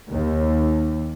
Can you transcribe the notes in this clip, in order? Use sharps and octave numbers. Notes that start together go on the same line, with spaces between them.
D#2